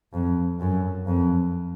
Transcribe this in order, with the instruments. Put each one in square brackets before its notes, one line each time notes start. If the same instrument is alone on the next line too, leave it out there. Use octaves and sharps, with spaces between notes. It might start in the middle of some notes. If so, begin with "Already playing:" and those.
[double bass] F2
F#2
F2